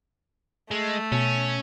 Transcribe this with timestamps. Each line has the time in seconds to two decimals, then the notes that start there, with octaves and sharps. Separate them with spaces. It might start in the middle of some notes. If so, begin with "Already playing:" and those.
0.71 G#3 A3
1.12 B2 C#4